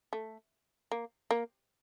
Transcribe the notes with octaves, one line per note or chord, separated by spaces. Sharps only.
A3
A#3
A#3